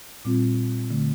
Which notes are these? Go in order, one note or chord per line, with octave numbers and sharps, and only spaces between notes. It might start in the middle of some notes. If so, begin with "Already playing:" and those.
A#2 G3 C4 F4
D3 A3